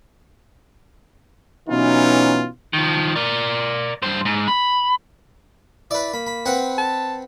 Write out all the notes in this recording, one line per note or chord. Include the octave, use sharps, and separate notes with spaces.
B2 E3 F#3 C#4 D#4 F4
D#3 F3
A#4 D5
G2 C5
G#2
B5
E4 B4 D5
A#3 B5
B5
C4 B4 F#5
A5